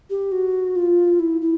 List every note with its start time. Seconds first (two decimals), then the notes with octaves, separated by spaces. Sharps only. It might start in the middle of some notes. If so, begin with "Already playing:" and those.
0.10 G4
0.32 F#4
0.76 F4
1.19 E4
1.41 E4